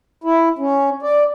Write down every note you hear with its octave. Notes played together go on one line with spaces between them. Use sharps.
E4
C#4
D5